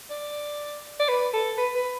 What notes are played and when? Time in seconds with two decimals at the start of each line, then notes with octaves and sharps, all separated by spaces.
0.10 D5
1.00 D5
1.08 B4
1.33 A4
1.58 B4
1.75 B4